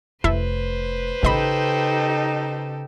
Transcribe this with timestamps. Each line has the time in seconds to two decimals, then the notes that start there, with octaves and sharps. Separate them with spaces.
0.24 F1 E4 A4 B4 C5 E5
1.23 A1 C#3 D#4 G4 A4 D#5 B5